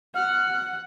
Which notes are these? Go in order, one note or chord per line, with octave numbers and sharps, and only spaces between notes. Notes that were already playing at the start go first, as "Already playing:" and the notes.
F#5 F6